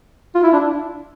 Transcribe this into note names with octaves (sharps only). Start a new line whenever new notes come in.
F4
E4
D4